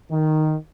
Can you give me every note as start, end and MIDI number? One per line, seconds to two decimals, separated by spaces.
0.11 0.55 51